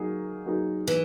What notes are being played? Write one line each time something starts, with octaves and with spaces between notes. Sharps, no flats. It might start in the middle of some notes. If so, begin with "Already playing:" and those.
Already playing: F#3 A#3 D#4 G#4
F#3 A#3 D#4 G#4
E3